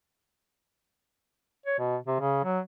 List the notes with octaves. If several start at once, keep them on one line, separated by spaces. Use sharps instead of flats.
C#5
B2
C3
C#3
F#3